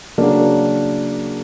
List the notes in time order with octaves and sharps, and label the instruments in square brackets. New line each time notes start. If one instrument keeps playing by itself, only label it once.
[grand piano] C#3 F#3 A#3 D4